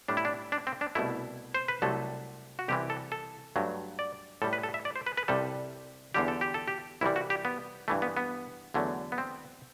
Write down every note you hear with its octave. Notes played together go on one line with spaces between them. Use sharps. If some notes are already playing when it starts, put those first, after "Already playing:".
A2 G3 D4
E4
D4
D4
C4
D4
C2 B2 A3 E4
C5
B4
C2 C3 F#3 A3 A4
F#4
C2 C3 E3 G4
A4
A4
G2 F#3 A3
D5
A2 G3 A4
B4
A4
E5
D5
C5
B4
B4
C2 C3 G3 A4
E2 D3 G3 G4
A4
G4
A4
G4
C2 C3 E3 G3 E4
F#4
G4
B3
G2 E3 A3
B3
B3
E2 D3 F#3 A3
B3
C4